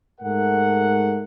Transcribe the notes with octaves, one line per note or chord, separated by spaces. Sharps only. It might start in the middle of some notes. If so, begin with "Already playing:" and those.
G#2 A3 A#4 F#5